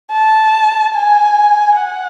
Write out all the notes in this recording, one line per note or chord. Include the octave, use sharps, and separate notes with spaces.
A5
G#5
F#5